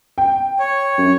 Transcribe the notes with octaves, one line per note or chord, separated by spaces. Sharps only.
G5
C#5
F#2